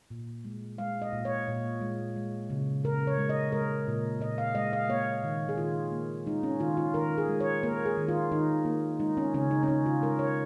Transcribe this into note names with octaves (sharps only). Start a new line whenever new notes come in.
A#2
G#3
G#3 F5
D#5
A#2
C#5
A#2
G#3
G#3
C#3
C#3 A#4
C#5
G#3
D#5
G#3 A#4
A#2
A#2 D#5
F5
G#3 D#5
F5
A#3 C#5
D#3
G#4
D#3 F4
A#3
G#3 D#4
C#4
D#3 F4
F4
D#3 A#4
G#4
G#3
C#5
A#3 A#4
G#4
D#3
F4
D#3 D#4
A#3
G#3 D#4
C#4
C#3 C#4
D#4
C#4
C#3 D#4
F4
G#3 A#4
C#5